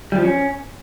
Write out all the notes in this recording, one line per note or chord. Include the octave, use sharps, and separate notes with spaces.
G3
F3
C#4